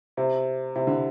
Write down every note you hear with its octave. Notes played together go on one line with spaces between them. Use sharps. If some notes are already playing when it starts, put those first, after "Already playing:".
C3
C3
D3